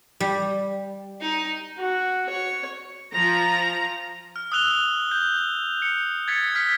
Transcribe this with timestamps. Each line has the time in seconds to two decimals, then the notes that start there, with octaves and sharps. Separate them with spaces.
0.20 G3
1.21 D#4
1.78 F#4
2.29 C#5
3.12 F3 A#5
4.36 F6
4.52 D#6 E6 F#6 F7 G7
5.11 G6
5.82 C#7
6.28 G#6 A6 B6 C#7
6.55 F6 B6